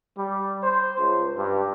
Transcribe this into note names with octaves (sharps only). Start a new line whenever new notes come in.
G3
C5
C#2
G2